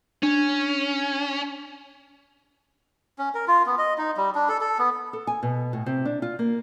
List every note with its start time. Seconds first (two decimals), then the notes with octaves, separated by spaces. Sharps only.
0.23 C#4 D4
3.19 C#4
3.35 A#4
3.48 F4
3.66 B3
3.78 D#5
3.98 D#4
4.17 G3
4.35 D4
4.49 A4
4.61 A4
4.78 B3
5.13 A4
5.27 G#5
5.43 B2
5.73 A2
5.86 C3
6.05 D4
6.22 F4
6.39 A#3